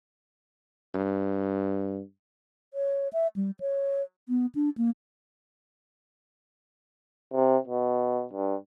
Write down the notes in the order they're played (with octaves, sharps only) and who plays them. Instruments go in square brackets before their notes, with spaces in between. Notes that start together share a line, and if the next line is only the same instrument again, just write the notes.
[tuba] G2
[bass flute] C#5
E5
G3
C#5
B3
D4
A#3
[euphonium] C3
B2
G2